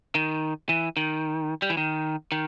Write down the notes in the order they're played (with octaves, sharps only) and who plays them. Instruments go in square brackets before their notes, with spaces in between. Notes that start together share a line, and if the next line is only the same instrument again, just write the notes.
[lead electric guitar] D#3
E3
D#3
G3
E3
D#3
D#3